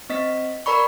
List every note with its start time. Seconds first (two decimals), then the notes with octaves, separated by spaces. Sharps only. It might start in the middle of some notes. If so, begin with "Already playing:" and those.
0.10 C4 D#5 B6
0.66 A#4 D5 B5 C#6